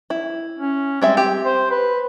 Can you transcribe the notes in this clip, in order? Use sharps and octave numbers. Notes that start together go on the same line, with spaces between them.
E4
C#4
G3 G#3 C4 E5
G4
C5
B4